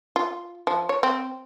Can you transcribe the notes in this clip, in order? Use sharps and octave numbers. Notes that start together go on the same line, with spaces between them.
F4
F3
C#5
C4